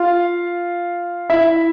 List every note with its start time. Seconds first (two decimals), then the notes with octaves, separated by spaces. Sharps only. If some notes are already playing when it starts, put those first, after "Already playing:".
Already playing: F4 F5
1.30 E4 E5